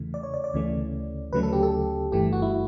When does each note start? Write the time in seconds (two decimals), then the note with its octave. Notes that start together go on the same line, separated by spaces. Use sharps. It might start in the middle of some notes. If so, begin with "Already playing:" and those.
Already playing: E2 C#3 E3 A3
0.14 D5
0.23 C#5
0.34 D5
0.44 D5
0.54 D2 C#3 E3 A3 C#4
1.32 D2 C#3 F#3 A3 C#4 B4
1.43 A4
1.53 G4
1.63 A4
2.12 G1 G2 E3 A3 G4
2.33 F#4
2.42 E4